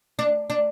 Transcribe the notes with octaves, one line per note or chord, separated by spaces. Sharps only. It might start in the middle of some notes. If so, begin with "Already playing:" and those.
D4
D4